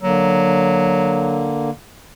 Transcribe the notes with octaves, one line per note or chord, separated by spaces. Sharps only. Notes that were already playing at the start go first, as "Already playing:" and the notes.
D3 F#3 A#3